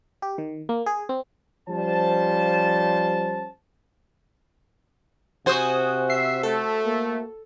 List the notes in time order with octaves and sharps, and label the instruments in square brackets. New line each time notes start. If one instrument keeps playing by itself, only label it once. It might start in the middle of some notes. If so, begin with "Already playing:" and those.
[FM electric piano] G4
D#3
A#3
G#4
C4
[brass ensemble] F3 G3 C#4 C5 A5
[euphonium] C3 [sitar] F#4 C5 [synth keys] G#5 D#6
[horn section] E5 [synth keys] C7
[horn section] A3 [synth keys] A4
[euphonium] A#3